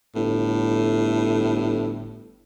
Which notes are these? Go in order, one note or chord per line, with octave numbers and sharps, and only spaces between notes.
G1 A2